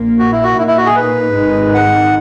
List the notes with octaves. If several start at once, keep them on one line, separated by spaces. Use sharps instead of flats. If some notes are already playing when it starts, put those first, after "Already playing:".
Already playing: A#1 A#2 A#3
F#4
E4
F#4
A#2 A#3 D#4 E4
E4
F#4
G#4
B4
G#1 G#2 D#3 G#3 D#4
F#5